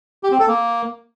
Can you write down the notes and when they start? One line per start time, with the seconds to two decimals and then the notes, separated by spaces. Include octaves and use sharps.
0.23 G4
0.31 C4
0.39 A4
0.47 A#3